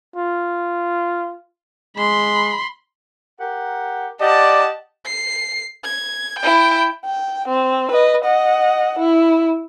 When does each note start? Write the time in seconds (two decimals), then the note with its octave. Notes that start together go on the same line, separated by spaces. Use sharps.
0.16 F4
1.97 G#3 B5 C6
3.40 G4 A#4 F#5
4.21 G4 D5 D#5 F#5 A5
5.05 C7
5.85 G#6
6.39 E4 G5
7.05 G5
7.48 C4
7.91 B4 D#5
8.24 D#5 F#5
8.99 E4